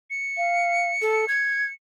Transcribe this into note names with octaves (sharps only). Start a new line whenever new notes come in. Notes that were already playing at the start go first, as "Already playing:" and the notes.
C#7
F5
A4
G#6